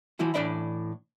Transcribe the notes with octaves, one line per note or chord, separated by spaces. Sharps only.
E3 F3 E4 F#4
A2 E3 D4 D5 E5 B5